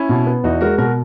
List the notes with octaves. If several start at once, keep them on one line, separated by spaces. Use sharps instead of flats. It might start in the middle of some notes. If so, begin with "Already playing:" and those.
Already playing: C#4 E4
B2
B3
E2 D#4 F#4
G#3 F#4 A#4
B2 F#4 A#4